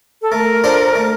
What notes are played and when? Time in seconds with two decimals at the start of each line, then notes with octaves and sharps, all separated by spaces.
0.22 A4
0.31 A3 A#4
0.64 D4 F4 A4 C5
0.95 A3